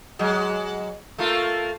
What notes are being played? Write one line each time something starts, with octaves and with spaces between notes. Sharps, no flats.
F#3 G#3
A3 A#3 F4